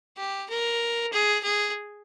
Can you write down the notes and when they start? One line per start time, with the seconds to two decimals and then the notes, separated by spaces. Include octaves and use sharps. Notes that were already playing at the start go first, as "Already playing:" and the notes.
0.17 G4
0.49 A#4
1.12 G#4
1.43 G#4